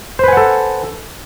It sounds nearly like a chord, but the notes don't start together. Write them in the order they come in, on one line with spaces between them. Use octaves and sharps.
C5 B4 G#5 F#5 A4